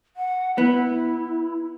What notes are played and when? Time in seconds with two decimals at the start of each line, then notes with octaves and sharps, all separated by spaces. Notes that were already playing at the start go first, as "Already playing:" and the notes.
0.16 F#5
0.58 B3 E4